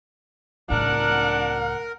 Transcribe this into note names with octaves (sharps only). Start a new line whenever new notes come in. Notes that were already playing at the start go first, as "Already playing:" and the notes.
C#2 A2 D4 A#4 F#5